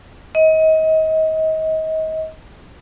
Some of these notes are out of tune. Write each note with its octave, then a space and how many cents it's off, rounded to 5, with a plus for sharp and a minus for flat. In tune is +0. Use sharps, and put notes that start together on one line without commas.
D#5 +30